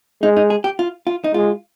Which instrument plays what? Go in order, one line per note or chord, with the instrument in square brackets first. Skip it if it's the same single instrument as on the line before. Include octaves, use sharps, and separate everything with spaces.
[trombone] G#3 [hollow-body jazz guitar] D#4
[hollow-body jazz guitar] D#4
G#4
G4
F4
F4
D#4
[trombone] G#3 [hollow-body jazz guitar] F4